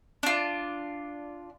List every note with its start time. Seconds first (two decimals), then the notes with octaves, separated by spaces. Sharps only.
0.23 D4 F4